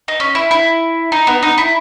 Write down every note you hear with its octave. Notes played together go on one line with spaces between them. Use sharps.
D#4
C#4
E4
E4
D#4
B3
D#4
E4